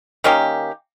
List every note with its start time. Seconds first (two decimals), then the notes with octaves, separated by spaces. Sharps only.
0.24 D#3 A#3 C#4 G4